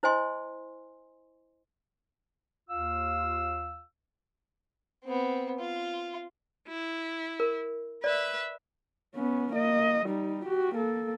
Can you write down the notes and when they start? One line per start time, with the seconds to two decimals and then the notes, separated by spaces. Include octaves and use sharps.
0.03 E4 C5 D#5 G#5 C6
2.69 D#2 F4 F5 E6
5.04 B3 C4
5.59 F4
6.68 E4
7.40 A#4
8.04 B4 D5 E5
9.15 B3 C#4
9.53 A#3 D#5
10.06 G3 D#4
10.46 F#4 G4
10.75 A#3 A4